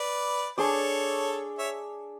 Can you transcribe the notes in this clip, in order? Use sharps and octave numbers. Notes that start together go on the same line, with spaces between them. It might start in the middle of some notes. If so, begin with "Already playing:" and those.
Already playing: B4 D5
D4 G#4 A4 C#5 D5
C#5 E5